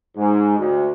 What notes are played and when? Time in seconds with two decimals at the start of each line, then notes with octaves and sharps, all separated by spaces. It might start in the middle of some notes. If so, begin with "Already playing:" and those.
0.15 G#2
0.58 D2